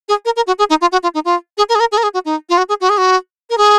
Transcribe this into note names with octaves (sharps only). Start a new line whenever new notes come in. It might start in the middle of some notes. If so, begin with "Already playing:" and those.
G#4
A#4
A#4
F#4
G#4
D#4
F4
F#4
F4
D#4
F4
G#4
A#4
G#4
A#4
G#4
A#4
G#4
F#4
D#4
F4
F#4
G#4
F#4
G#4
F#4
A#4
G#4